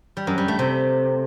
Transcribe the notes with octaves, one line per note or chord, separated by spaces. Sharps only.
G3
F#2
G3
A3
C3